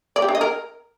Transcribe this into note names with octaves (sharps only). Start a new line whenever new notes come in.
D5
G4
D4
D#5
A#4